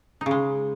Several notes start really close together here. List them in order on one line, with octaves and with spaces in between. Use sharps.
D#4 C#3 G#3